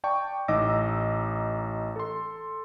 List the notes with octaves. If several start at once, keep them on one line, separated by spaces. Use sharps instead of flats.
D5 G5 A5 C#6
A1 D#4 D#5 D6 E6 A#6
A4 C6